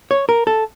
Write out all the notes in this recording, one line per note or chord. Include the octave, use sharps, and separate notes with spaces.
C#5
A#4
A4